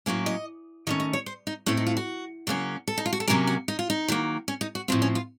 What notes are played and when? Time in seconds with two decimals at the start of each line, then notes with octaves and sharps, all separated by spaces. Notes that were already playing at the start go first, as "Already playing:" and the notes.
0.06 A2 F#3 A#3 C#4
0.26 D#5
0.87 D#3 A3 C#4 D#5
1.00 D#5
1.13 C#5
1.26 C5
1.47 D#4
1.66 A2 A3 C4 C#4
1.77 D#4
1.87 F4
1.97 F#4
2.47 C#3 F#3 A#3 C#4
2.88 A4
2.98 D#4
3.06 F4
3.13 F#4
3.20 A4
3.28 C3 F#3 A#3 C#4 A#4
3.47 F#4
3.68 D#4
3.79 F4
3.90 D#4
4.08 D#3 F#3 A#3
4.48 C#4
4.61 D#4
4.75 F#4
4.88 A2 F3 C4 F4
5.02 C#4
5.15 F4